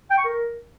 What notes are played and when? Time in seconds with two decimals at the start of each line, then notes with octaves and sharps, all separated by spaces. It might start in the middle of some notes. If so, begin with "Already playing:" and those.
0.11 G5
0.18 C#6
0.25 A#4